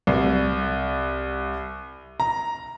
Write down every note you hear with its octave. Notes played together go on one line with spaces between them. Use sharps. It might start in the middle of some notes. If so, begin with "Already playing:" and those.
C2
A#5